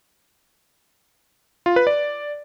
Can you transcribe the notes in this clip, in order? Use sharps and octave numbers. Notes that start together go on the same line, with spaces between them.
F4
B4
D5